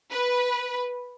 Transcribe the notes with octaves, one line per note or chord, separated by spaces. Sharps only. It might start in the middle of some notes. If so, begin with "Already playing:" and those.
B4